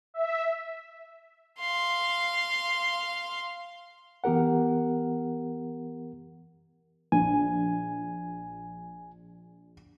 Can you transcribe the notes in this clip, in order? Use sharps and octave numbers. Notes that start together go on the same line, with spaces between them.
E5
F5 C6
E3 B3 G4 A#4 F#5
A#1 G#5